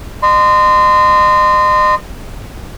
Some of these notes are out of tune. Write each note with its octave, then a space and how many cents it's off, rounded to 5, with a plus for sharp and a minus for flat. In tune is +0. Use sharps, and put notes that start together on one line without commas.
D#5 -35 C6 -25